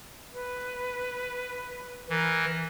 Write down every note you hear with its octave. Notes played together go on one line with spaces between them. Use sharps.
B4
E3 A#4